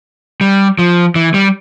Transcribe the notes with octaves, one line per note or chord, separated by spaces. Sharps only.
G3
F3
E3
G3